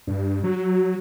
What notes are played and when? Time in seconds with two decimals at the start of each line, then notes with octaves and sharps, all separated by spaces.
0.07 G2
0.44 F#3